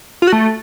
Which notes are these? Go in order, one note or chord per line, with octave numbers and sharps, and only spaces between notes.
F4
F#4
A3